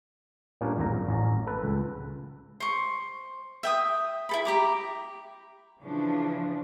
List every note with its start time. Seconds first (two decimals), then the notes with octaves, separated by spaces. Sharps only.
0.61 A#2 G3 A#3 C#4 D4
0.77 G#1 E2 A#2 A#5
0.92 F#2
1.09 A1 C#4 A#5
1.47 A4 B4
1.64 C#2
2.60 C5 C#6
3.63 E5 G5 D#6
4.29 E4 A4 B5
4.45 G4 A#5 D6
5.80 C#3 E3 F3 D4